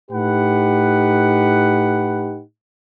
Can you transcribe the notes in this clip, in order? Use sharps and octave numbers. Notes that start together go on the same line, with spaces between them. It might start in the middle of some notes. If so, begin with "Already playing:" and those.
A2 D#4 G4 B4 F#5